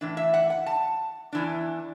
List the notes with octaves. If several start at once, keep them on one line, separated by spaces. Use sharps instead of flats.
A2 E3 D4
E5
F#5
F#5
A5
E2 E3 D4